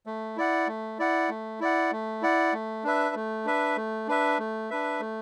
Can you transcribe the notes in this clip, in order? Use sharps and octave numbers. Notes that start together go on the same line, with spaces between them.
A3
E4 D5 F#5
A3
E4 D5 F#5
A3
E4 D5 F#5
A3
E4 D5 F#5
A3
D4 B4 E5
A3
D4 B4 E5
A3
D4 B4 E5
A3
D4 B4 E5
A3